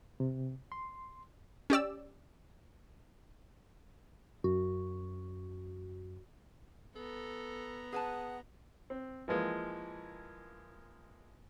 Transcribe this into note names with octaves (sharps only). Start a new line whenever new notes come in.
C3
C6
C#4 G4 D5 E6
F#2 F#4
B3 A4 A#5
G#4 B4 F#5 A5
C4
E3 F3 G#3 A#3